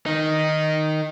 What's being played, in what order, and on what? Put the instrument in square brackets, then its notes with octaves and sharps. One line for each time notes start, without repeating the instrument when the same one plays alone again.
[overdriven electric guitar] D#3 D#4